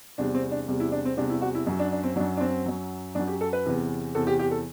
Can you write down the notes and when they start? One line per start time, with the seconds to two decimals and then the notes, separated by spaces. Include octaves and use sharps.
0.18 E2 C3 G3 D4
0.35 C4
0.51 D4
0.68 E2 C3 G3
0.80 E4
0.92 D4
1.05 C4
1.17 E2 C3 G3 D4
1.30 E4
1.41 F#4
1.55 E4
1.67 F#2 F#3
1.79 D4
1.92 D4
2.04 C4
2.16 F#3 D4
2.20 F#2
2.37 D4
2.41 C4
2.65 F#2 F#3
3.15 F#2 F#3 D4
3.27 G4
3.41 A4
3.53 B4
3.66 E2 C3 E3
4.15 E2 C3 E3 A4
4.27 G4
4.39 G4
4.51 A4